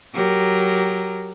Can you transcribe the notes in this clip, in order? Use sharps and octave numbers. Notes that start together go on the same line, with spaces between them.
F#3 G4 A#4